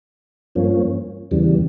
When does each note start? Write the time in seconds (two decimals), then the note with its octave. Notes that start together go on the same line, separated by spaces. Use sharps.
0.55 G2 F3 A#3 C#4
1.31 E2 C#3 E3 G3